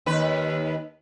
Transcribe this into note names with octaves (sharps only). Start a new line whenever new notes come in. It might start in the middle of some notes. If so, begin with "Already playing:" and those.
D#2 B4